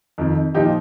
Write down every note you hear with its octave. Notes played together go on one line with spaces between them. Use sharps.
F2 D#3
A#2 F3 D#4 G4